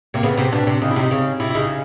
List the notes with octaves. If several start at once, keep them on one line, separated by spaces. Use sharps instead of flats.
C3 A#3
C#3 B3
C3 C4
B2 D4
C3
C#3 D#4
E4
C3 D#4
C#3
C3 E4
E4
C#3 D#4